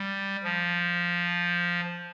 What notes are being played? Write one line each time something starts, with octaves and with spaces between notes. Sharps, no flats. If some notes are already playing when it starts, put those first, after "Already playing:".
Already playing: G3
F3